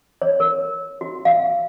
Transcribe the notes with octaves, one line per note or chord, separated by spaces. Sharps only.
C#5
A#4
F#4
F5